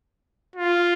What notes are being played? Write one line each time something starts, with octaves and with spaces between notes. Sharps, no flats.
F4